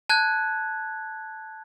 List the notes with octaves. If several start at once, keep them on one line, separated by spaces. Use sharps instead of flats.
A5 F#6 G#6